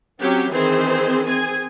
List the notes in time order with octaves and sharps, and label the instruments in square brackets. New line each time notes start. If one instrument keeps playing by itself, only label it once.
[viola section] F#3 C4 C#4 G4
D#3 E3 C4 G#4 C5
C4 G#4 G#5